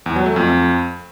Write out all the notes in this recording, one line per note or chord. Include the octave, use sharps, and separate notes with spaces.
E2
F#3
A3
F2